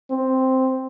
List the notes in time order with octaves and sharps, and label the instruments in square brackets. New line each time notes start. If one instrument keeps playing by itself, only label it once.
[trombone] C4